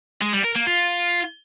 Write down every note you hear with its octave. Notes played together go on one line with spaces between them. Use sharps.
G#3
G3
A#4
A#3
F4